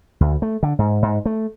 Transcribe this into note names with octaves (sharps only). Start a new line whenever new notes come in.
D2
A3
D3
G#2
G#2
A3